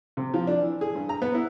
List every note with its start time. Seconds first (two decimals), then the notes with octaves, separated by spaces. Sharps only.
0.17 C3
0.34 F3
0.47 D4
0.61 E3
0.81 G#4
0.95 G2
1.09 A#5
1.22 B3
1.35 E4